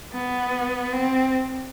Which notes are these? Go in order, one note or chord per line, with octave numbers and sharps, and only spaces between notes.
B3
C4